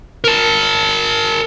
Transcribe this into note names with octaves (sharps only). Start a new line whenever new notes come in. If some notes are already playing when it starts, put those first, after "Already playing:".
A#4 A5